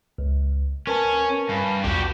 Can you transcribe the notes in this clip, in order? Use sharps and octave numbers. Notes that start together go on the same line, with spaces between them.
C#2
C#4 A#4 B4 A5
G2
B1 E2 F#4 G4